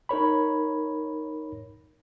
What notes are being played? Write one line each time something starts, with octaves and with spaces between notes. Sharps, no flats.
D#4 A#4 C#5 B5